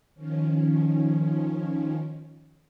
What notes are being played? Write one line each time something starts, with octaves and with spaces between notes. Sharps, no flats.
D#3 F3 C#4